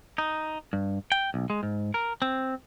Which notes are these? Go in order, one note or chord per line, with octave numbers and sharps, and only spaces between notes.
D#4
G2
G5
B1
G#3
G#2
A#4
C4